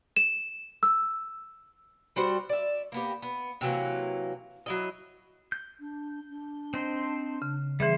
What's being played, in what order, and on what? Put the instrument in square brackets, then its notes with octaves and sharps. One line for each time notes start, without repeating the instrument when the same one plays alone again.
[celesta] E7
E6
[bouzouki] G3 F#4 C5
D5 E5
A#3 B3 G4
B3
C3 E3 F#3 A#3
F#3 E4 D#5
[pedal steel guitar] G6
[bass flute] D4
D4
[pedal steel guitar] C4 D#4 C5
[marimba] C#3
[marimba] E3 G#4 [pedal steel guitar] G3 B3 C5 [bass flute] E5